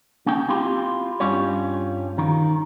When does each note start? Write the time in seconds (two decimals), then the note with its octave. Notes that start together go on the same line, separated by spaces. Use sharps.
0.26 A#3 C#4 D#4 G5
0.48 C4 E4 F4 G4 C6
1.20 G2 G3 C#4 F4 C#5
2.18 D#3